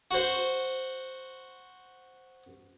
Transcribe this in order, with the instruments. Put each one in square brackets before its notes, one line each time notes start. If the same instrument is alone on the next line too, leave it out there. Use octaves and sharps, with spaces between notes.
[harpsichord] F#4 C5